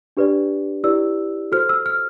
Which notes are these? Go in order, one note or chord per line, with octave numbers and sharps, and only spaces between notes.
D4 G4 B4 D5
E4 G4 B4 D5 E6
F#4 A4 C5 F6
E6
F6